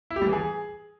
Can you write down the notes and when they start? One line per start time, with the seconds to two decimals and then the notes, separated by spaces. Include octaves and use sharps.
0.10 E4
0.16 G4
0.22 G3
0.27 E3
0.33 G#4